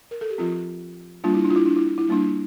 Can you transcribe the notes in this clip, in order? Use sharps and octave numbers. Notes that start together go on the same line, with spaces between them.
A#4
A4
G4
F3 C4 F4
G3 A#3 D4 F4
E4
D4
F4
E4
D4
E4
E4
E4
G3 A#3 D4